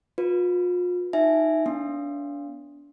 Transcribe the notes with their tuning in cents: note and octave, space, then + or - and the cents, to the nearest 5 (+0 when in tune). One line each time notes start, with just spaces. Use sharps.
F4 +40 B4 -20
D#4 +0 E5 +0 G#5 +0
B3 +0 D4 -30